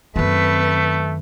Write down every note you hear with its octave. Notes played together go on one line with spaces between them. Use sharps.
F#2 D#3 A3 C4 B4